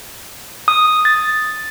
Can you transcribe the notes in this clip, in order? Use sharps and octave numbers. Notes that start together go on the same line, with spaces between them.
D#6
A6